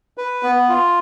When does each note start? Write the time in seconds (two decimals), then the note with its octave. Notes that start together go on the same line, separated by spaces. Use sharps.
0.18 B4
0.43 B3
0.69 F4